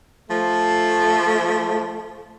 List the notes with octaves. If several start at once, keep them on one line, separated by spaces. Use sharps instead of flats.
F3 A3